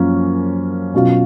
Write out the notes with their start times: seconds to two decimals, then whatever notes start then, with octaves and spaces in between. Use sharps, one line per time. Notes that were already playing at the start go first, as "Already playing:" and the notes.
Already playing: F#2 F3 A#3 C#4 F4
0.94 B2 F#3 C#4 F4